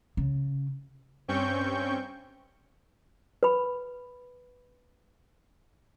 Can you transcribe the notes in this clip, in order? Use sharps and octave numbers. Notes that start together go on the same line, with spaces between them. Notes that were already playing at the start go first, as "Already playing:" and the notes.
C#3
G2 C4 C#4 G5 C#6 G6
B4 B5